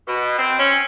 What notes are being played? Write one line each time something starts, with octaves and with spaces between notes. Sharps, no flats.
B2
C4
C#4